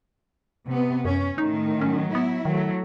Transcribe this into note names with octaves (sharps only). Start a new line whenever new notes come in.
C3 B3
F#2 C#4
A2 D#3 D#4
F#3 C#4
B3 E4
D#3 F#3 A3